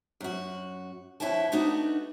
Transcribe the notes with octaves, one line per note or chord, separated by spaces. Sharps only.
F#2 F#4
F2 B2 E4 C#5 G5 A5
A3 B3 D4 D#4 F#4